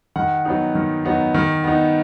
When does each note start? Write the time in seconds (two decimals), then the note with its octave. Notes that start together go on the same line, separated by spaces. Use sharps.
0.16 D#3 F#5
0.45 F#3 B3 D#4
0.75 D#3
1.05 F#3 B3 D#4
1.34 D#3
1.64 B3 D#4